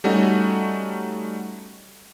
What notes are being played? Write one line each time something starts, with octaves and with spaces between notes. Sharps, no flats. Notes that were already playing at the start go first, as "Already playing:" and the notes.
G3 A3 C#4 D#4 F#4